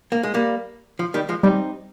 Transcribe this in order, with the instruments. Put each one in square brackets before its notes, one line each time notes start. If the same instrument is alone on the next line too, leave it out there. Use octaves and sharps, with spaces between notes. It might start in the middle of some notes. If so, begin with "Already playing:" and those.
[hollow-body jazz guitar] A#3
G#3
G3 A#3
F3
D#3 G3
F3 G#3
[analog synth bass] G3 [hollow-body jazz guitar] C4 D#4